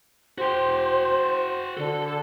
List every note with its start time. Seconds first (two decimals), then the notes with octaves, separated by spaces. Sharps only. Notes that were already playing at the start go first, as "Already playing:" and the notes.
0.38 F#4 C5 G5
1.77 D3 A4